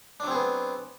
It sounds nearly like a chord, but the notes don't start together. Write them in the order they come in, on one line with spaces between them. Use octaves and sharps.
D4 F#3 C4 G#4 B3